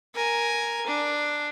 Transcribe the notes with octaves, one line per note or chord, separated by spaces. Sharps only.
A#4 G#5
D4